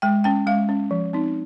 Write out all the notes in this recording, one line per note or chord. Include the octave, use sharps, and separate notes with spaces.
G#3 G5
C#4 G5
G#3 F5
C#4
F3
C4 D#4